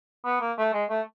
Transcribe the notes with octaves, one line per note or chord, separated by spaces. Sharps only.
B3
A#3
A3
G#3
A3